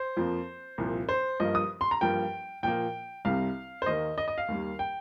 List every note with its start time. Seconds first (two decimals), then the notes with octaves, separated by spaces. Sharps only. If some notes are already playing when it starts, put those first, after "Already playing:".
Already playing: C5
0.17 F2 F3 A#3
0.78 C2 A#2 F3
1.09 C5
1.40 G2 F3 A#3 D#5
1.55 D#6
1.81 C6
1.91 A#5
2.01 G2 F3 A#3 G5
2.63 A#2 F3 A#3 G5
3.25 C2 C3 G3 F5
3.82 C5
3.86 D#2 D#3 A#3 D#5
4.18 D#5
4.28 D#5
4.38 F5
4.48 D#2 D#3 G3 A#3
4.79 G5